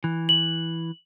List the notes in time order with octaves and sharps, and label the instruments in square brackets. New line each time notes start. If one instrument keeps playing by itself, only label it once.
[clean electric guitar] E3
[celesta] F#7